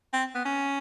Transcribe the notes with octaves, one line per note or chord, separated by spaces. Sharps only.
C4
B3
C#4